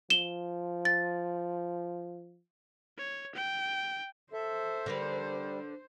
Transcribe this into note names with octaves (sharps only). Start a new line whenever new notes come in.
F3 E7 G7
A6
C#5
G5
A4 C5 E5
D3 G3 A#4 B4